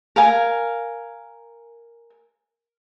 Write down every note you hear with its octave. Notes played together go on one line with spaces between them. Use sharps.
A#4 F5 G#5